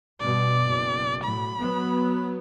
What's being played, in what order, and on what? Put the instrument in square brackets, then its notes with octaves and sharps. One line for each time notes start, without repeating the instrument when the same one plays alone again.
[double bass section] G2 B2 [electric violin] D5
[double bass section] F#1 B2
[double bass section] A2 F#3 [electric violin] B5
[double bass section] F#3 B3